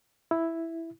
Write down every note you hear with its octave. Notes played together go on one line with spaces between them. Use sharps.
E4